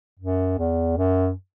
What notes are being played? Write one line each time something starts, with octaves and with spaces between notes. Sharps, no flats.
F#2
E2
F#2